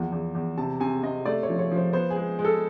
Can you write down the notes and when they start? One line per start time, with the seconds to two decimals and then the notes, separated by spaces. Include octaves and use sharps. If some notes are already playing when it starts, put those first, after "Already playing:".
Already playing: E2 F3
0.12 E2
0.35 E2
0.57 C3 A5
0.80 C3 G#5
1.03 C3 D#5
1.25 A3 D5
1.43 C#5
1.49 F3
1.59 C#5
1.71 F3
1.76 C5
1.93 B3 C5
2.10 G#4
2.16 G#3
2.39 G#3
2.45 A4